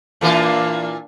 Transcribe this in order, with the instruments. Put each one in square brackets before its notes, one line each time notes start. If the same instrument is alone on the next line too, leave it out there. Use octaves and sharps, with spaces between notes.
[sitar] A#2 E3 F4 [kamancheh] A#3 D4